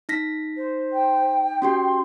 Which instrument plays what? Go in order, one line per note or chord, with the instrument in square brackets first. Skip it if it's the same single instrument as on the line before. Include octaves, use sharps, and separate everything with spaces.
[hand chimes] D#4 A#6 B6
[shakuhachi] C5
[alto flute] G5
[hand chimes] C#4 F#4 G4 [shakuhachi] C6